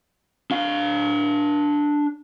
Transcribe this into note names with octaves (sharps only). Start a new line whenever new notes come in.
D4 F5